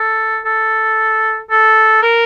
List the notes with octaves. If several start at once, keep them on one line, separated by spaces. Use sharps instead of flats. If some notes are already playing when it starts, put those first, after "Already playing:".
Already playing: A4
A4
A4
A#4